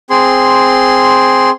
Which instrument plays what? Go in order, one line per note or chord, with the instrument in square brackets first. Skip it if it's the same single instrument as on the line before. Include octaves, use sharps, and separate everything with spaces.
[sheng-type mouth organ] C4 G#4 C6